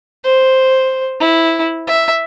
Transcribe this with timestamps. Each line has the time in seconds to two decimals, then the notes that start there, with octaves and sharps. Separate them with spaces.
0.24 C5
1.20 E4
1.87 E5